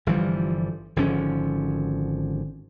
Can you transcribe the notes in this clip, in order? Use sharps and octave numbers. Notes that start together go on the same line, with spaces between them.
G1 E3 F3 G3
G#1 D3 F3 C#4